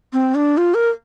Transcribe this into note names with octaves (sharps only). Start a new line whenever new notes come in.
C4
D4
F4
A#4